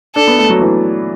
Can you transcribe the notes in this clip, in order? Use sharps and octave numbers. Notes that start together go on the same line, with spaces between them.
D4 A4
B3
A3
F#3
E3